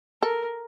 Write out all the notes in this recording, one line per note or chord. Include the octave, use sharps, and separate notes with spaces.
A4 A#4